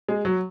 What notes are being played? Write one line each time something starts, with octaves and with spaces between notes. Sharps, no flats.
G#3
F#3